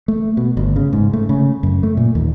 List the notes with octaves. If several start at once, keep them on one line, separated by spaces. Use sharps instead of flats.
A3
B2
G1
C#3
G#2
A3
C#3
F#2
A3
A#2
D#2